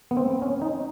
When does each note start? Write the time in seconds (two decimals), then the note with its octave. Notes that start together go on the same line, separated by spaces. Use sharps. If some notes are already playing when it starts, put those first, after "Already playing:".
0.11 B3
0.17 C4
0.42 C#4
0.62 D#4